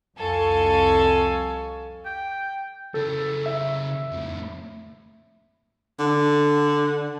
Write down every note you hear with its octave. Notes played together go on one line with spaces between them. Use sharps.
C2 F2 A4 F5 G#5 C#6
G5
C#3 A4 A#4
E5
F2 A2
D3